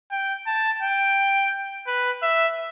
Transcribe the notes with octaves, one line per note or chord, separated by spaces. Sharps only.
G5
A5
G5
B4
E5